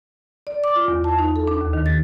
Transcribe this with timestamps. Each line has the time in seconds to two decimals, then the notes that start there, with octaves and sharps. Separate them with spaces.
0.47 D5
0.64 D6
0.76 F4
0.88 E2
1.04 A5
1.19 D#4
1.36 A4
1.48 D4
1.61 D#2
1.73 D#3
1.86 A6